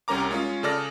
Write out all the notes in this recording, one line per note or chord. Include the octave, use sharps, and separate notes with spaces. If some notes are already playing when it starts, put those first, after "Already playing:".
C2 G3 C#4 A#4 A#5 D6
G#3 C#4 F4
C#3 G#4 A4 D5 F6 A#6